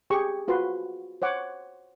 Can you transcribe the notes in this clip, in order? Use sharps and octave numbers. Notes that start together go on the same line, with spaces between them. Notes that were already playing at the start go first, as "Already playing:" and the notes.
G4 G#4 C#6
F4 F#4 B4 C5 C6
C5 C#5 F#5 D6